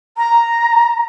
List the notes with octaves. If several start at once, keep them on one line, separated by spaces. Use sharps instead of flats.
A#5